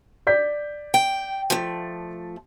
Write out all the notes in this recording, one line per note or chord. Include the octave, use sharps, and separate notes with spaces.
D5 G6 B6
G5
F3 A3